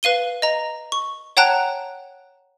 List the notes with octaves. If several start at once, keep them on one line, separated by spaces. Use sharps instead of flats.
B4 F5 D#7 G7
D#5 A#5
C#6
C#5 F#5 G5 A5 A#5 F#6